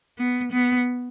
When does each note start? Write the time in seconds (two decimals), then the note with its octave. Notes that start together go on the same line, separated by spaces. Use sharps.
0.18 B3
0.52 B3